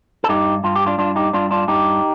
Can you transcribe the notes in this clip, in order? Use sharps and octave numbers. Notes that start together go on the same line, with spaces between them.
A4
G2 D#4 G4
G2 F4
G4
D4 F4
G2 D4 F4
D#4 G4
G2 D4 F4
D4 F4
G2 D#4 G4